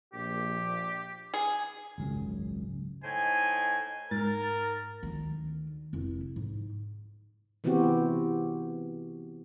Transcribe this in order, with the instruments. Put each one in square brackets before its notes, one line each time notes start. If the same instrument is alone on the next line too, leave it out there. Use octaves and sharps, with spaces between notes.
[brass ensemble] A#1 [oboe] G4
[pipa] G#4
[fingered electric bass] G#1 C#2 F#2
[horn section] A2 D#4 C5 G#5
[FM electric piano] G#2 A6 [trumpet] A#4
[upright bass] D2 D#3
F1 E4
G#2
[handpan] C3 E3 B3 C4 F#4 G4